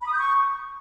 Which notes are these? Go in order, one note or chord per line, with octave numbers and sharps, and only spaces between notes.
B5
D#6
G6
C#6